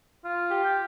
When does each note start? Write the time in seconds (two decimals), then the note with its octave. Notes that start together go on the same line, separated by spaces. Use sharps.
0.25 F4
0.50 G4
0.65 G5